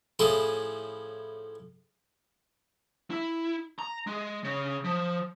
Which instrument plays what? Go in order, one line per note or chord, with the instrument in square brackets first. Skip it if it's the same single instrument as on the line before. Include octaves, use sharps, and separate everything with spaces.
[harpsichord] A2 F3 C#4 E4 G#4 A4
[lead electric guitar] E4
A#5
G#3
C#3
F3